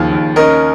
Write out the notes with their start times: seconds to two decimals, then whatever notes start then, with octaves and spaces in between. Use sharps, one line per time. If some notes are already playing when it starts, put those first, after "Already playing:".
Already playing: D#2 C#3 F3
0.12 D#2
0.36 C#4 A#4 D#5